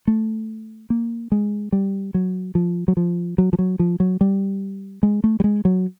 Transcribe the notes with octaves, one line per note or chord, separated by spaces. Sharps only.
A3
A#3
G#3
G3
F#3
F3
F#3
F3
F#3
F3
F#3
F3
F#3
G3
G#3
A3
G3
G#3
F#3